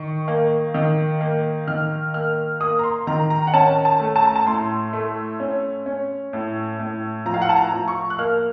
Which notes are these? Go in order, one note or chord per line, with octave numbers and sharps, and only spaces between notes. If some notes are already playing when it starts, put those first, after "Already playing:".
Already playing: D#3 C#6
A#3
D#3
A#3
D#3 F6
A#3 F6
A#3 D#6
A#5
C6
D#3 A#5
A#5
F#5
C#4 A5
A5
A3
A5
A#5
A5
A2 C6
A3
C#4
C#4
A2
A2
F3 A#5
F5
F#5
A5
A#5
F3
C#6
F#6
A#3 F6